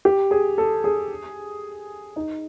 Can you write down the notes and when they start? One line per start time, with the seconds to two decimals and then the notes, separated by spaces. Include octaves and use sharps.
0.05 G4
0.31 G#4
0.58 A4
0.84 G#4
2.16 D#4